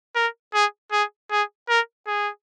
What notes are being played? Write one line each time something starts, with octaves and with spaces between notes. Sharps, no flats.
A#4
G#4
G#4
G#4
A#4
G#4